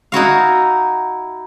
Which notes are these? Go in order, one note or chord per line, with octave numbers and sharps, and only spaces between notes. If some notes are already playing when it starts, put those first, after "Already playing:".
D#4 E4 F#4 F5